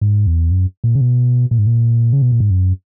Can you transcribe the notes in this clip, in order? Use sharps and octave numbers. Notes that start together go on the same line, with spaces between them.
G#2
E2
F#2
A#2
C#3
B2
A#2
G#2
A#2
C#3
B2
A#2
G#2
F#2